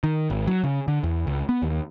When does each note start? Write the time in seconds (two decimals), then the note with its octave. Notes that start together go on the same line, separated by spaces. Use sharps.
0.04 D#3
0.30 G#1
0.47 F#3
0.64 C#3
0.88 D3
1.03 E2
1.27 C#2
1.49 B3
1.62 D#2